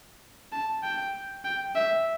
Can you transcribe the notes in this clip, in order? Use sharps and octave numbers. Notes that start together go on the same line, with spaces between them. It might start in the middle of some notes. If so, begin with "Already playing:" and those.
A5
G5
G5
E5